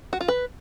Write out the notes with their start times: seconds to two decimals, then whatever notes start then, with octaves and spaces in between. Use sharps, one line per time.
0.13 F#4
0.21 F4
0.28 B4